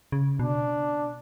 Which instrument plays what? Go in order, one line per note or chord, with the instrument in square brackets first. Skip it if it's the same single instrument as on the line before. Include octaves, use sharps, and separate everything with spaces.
[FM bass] C#3
[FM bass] B2 [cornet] D4